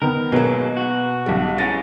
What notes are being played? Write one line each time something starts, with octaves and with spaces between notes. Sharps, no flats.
D#3 B3 A#4
D#2 B2 F#3 G#3 A#3 B4
F#4
B1 G3
C#3 E3 C#4 A6 A#6